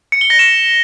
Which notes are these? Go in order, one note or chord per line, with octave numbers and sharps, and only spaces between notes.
C#7
G7
A#6
E7